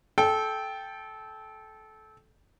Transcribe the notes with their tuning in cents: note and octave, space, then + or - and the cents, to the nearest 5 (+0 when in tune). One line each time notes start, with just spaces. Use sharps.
A4 -20 G5 +0